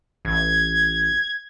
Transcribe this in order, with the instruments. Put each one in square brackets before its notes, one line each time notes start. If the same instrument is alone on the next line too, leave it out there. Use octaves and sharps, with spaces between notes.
[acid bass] A1 [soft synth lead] G#6